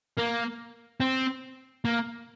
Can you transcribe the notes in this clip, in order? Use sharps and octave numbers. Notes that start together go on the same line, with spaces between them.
A#3
C4
A#3